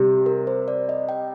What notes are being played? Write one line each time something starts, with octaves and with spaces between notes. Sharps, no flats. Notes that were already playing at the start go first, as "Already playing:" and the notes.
Already playing: C3 G3 G4
A#4
C5
D5
D#5
G5